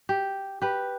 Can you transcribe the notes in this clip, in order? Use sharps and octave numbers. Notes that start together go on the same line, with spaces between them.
G4
G4 B4